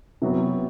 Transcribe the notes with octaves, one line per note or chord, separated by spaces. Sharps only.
C3 F#3 B3